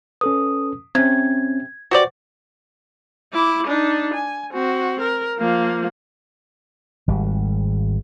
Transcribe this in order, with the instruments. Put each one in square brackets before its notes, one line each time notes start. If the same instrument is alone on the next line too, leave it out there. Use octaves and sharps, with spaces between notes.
[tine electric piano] C#4 A4 B4 [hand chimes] D#6
[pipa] C3 [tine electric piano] C4 C#4 [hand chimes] G#6
[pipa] F#4 G4 D5 [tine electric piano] B4 C5
[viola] E4 D6
D4 D#4
G#5
C4 F#4
A#4
F3 A#3
[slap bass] G#1 G3